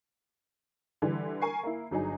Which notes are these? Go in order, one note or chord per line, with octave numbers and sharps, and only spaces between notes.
D3 E3 G3
A#4 G#5 C#6 C7
A#3 E4
G1 F#3 D#4 G#4